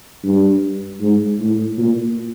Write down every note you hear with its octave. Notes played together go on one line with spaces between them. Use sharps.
G2
G#2
A2
A#2